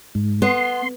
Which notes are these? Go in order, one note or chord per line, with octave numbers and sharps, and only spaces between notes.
G#2
B3 C6